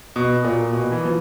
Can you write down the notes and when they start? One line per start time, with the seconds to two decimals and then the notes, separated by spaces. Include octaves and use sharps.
0.16 B2
0.44 A#2
0.73 B2
0.92 E3
1.05 F3